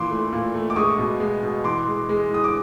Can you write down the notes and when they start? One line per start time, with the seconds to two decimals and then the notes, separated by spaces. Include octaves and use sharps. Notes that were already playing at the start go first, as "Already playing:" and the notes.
Already playing: A#2 E3 C6 D6
0.10 A3
0.32 A#2
0.54 A3
0.70 D6
0.76 G#3 C#6 D#6
0.98 B2
1.20 G#3
1.43 B2
1.64 E3 C6 D6
1.87 G#3
2.09 G#3
2.31 E3 D#6
2.44 D6